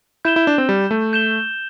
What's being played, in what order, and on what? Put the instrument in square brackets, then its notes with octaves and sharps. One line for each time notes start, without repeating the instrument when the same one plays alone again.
[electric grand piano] E4 [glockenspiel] G6 E7 G7
[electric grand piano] E4
D4
C4
G3
A3
[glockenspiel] G6 E7 G7